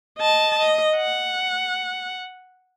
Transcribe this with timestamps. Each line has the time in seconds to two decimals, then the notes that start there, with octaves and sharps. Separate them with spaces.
0.18 D#5 A5
0.58 D#5
0.96 F#5